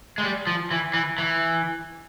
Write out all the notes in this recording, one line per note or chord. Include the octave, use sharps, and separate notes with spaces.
G#3
G3
F3
E3
E3
E3